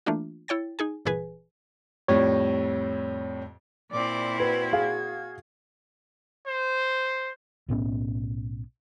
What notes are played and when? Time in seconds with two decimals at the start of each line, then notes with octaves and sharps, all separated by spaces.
0.06 E3 A3 A#3 D4 F4
0.48 E4 C#5 G5 A6
0.79 D#4 G#4 G#5
1.05 G1 A#2 E3 G#4 B4 G#5
2.08 F2 A2 G3 C#5
3.91 A#2 C4 E4 D5 D6
4.40 F#4 B4 G#6
4.73 G#4 F5
6.47 C5
7.69 B1 A2 B3 C#4